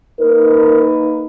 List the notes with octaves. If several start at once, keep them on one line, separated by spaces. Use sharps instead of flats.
A#3 D#4 A#4 B4